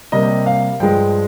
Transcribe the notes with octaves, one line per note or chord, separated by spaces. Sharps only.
C3 G3 A#3 D#5
F5
G2 F3 G#3 G5